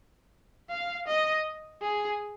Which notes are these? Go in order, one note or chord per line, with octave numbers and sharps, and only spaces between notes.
F5
D#5
G#4